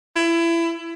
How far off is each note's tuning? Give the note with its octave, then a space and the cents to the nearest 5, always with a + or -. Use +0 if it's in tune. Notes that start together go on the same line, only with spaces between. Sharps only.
E4 +25